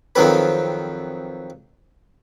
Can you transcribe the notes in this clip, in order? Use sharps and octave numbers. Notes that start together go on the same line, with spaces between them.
F2 D#3 F#3 C4 B4